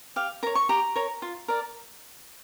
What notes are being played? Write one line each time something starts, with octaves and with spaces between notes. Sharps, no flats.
G4 F5
A#4 C#5 A#5
C#6
G4 A#5
A#4 C#5
F4
A#4 D5